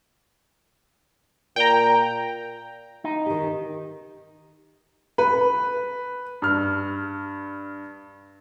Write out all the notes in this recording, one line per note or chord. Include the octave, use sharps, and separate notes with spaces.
A#2 G5 A#5
D#4
D#3 G4
B4
G2 F6